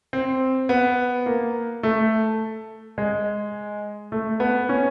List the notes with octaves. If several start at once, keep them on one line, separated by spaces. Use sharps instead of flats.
C4
B3
A#3
A3
G#3
A3
B3
C#4